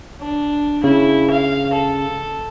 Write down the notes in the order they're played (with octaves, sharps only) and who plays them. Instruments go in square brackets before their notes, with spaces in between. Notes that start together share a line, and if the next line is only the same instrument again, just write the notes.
[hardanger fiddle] D4
[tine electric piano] C#3 [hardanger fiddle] E4
[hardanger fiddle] F5
A4